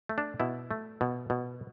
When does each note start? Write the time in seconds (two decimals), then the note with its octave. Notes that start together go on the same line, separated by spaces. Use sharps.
0.09 A3
0.18 D4
0.40 B2 E4
0.71 A3
1.01 B2
1.30 B2